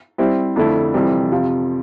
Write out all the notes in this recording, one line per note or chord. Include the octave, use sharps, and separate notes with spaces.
G3 C4 E4
F2 D3 A3 E4
F2 C3 E3 G3 C4
F2 C3 F3